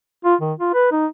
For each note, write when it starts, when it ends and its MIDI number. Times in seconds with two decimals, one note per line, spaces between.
0.24 0.35 65
0.41 0.53 51
0.59 0.72 65
0.74 0.88 71
0.92 1.06 63